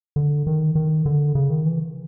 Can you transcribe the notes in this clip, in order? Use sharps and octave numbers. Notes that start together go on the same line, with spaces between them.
D3
D#3
D#3
D3
C#3
D#3
E3